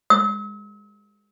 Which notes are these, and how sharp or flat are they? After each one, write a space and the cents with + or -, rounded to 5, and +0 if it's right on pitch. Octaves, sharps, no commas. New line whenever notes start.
E6 -45